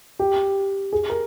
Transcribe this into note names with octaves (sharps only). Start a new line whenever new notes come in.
G4
G#4
A#4